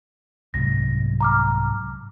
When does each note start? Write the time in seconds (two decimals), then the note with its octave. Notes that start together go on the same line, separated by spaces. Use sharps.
0.54 C2 G#2 F#3 A#6
1.21 A#5 D6 F6